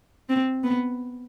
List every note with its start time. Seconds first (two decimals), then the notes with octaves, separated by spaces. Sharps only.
0.29 C4
0.63 B3